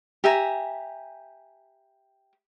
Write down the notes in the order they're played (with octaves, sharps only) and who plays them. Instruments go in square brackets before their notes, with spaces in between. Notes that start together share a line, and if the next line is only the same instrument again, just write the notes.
[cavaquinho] G4 E5 G#5 A#5